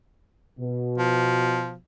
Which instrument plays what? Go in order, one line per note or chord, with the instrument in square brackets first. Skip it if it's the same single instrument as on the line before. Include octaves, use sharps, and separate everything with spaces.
[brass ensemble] B2
[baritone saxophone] F3